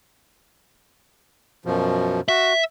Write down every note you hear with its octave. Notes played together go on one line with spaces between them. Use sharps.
F#2 B2 F3
F#4 E5